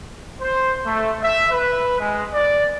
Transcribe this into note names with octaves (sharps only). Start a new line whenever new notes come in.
C5
A3
E5
B4
G#3
D5